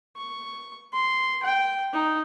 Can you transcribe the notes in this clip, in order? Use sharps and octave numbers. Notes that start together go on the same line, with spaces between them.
C#6
C6
G5
D#4